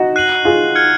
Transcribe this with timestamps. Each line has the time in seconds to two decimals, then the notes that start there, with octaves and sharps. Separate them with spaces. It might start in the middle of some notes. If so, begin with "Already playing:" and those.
Already playing: D#4 F#4
0.16 F#6 C7 D#7 F#7
0.45 F4 G#4
0.75 F6 G#6 C#7